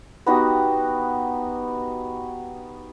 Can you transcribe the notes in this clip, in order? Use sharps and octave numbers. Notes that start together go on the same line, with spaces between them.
B3 D#4 F#4 G4